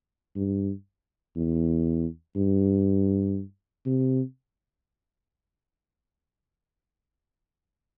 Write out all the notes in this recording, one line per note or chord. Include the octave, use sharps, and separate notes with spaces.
G2
E2
G2
C3